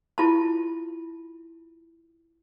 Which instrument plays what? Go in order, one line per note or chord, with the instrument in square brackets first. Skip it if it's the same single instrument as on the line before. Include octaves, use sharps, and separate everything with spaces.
[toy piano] E4 F4 A5